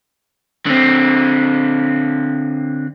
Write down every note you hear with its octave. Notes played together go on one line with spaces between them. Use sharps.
D3 C4